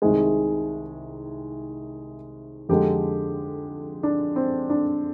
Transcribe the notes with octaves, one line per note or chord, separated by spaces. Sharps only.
C2 C3 D#3 G#3 G#4
F2 D3 G#3 G4
D4
C4
D4